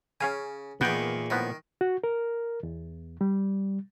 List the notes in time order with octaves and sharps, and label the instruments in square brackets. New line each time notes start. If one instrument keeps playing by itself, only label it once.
[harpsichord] C#3 [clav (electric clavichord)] C#4 F5 G#5
[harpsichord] E2 D#3 [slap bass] A#2 [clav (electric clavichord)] B3 G5
[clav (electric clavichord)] A2 F3 B3 [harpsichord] D#3
[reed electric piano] F#4
A#4
E2
G3